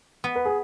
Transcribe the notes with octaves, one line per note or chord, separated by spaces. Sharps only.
B3
B4
G#4